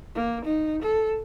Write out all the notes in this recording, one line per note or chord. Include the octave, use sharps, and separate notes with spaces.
A#3
D#4
A4